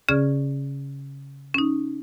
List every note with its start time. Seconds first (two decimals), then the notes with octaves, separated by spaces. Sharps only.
0.09 C#3 C#4 G#4 D5 F6 G#6
1.54 C#4 D#4